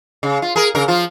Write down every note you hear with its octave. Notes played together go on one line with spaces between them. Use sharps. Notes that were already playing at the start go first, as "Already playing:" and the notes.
C#3
F4
G#4 A#4
C#3 A#4
F3 F4